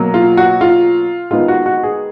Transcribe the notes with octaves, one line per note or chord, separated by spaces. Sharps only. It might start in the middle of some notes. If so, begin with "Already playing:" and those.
Already playing: B2 F#3 A#3
F4
F#4
F4
D#3 G#3 B3 F4
F#4
F#4
G#4